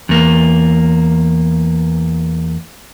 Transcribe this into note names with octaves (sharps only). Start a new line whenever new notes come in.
E2 A#3